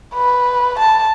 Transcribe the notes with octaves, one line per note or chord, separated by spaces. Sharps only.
B4
A5